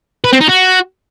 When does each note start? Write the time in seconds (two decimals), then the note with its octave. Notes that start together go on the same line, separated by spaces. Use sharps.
0.24 B4
0.32 C4
0.41 D#4
0.49 F#4